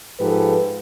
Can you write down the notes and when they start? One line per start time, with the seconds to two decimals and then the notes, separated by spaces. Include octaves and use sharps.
0.19 G#2 F3 G4 A4 B4